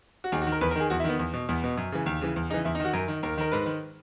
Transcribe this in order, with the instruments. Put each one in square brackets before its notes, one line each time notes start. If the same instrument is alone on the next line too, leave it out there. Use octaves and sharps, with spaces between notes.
[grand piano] F#4
D#2 G#4
F#4
D#3
A#4
E2 B4
A#4
D#3 G#4
E2 F#4
E4
D#3 B3
E2
B2
E2 B3
B2
F#2
C#3 E3
D#2
C#3 E3
E2
C#3 D#4
E3
E2 E4
D#4
D#3 F#4
F#2 A#4
D#3
D#2 A#4
D#3 A#4
G#2 B4
D#3